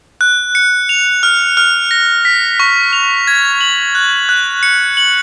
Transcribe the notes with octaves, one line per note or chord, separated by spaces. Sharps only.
F#6
C#7
F7
F6
F6
A#6
B6
C#6
F7
G#6
F#7
F#6
F#6
C#7
F#7